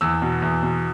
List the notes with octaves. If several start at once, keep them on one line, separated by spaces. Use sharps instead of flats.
E2 E6
B2
E2
B2